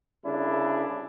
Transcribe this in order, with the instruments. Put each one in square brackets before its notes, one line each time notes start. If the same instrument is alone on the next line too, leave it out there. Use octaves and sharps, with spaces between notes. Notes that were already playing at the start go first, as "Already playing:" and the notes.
[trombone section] C2 C#3 D4 E4